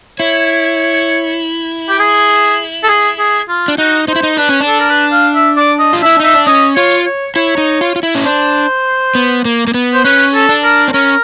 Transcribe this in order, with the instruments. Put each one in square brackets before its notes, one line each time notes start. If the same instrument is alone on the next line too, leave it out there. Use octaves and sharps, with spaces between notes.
[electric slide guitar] E4 [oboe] C#5
[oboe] G4
G#4
A4
G#4
G#4
F4
[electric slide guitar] D4
[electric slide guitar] D#4 [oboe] F#4
[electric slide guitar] D#4 [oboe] C5
[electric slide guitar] E4
D#4
[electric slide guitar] D4 [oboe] B4
[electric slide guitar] C#4
D4
[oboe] A4
A#4
B4
F5
E5
D5
D#5
[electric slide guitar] F4
[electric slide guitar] E4 [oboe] E5
[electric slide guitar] D#4 [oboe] E5
[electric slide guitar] D4
[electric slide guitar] C#4 [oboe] D#5
[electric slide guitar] F4 [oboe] C#5
[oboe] C#5
[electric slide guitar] E4 [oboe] C#5
[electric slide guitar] D#4
F4
F4
E4
C#4
[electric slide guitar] D4 [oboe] C5
[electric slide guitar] B3
A#3
A#3
B3
[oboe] C5
[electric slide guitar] C#4 [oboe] B4
[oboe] A4
[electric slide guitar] D4
[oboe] A#4
[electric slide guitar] C4
[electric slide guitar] C#4 [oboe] A#4